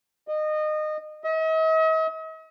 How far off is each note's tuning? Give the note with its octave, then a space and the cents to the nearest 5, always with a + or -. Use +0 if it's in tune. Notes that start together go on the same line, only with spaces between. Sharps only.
D#5 -25
D#5 +45